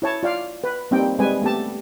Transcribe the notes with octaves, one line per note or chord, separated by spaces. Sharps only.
E4 C#5 A5
F4 D5 F5
B4
G3 A#3 C4 D#4 G5
G3 G#3 C4 B4 G#5
A3 B3 G4 A5